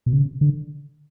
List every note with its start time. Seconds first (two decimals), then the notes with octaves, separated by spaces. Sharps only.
0.06 B2
0.13 C#3
0.41 D3